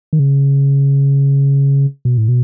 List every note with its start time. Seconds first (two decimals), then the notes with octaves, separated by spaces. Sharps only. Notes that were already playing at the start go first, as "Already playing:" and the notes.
0.13 D#3
0.19 C#3
2.05 B2
2.18 A2
2.28 B2